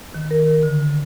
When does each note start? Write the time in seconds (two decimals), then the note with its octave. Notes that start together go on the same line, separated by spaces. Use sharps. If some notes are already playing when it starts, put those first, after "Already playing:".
0.14 D#3
0.31 A#4
0.63 D3